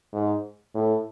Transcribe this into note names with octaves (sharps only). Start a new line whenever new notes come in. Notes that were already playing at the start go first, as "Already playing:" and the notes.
G#2
A2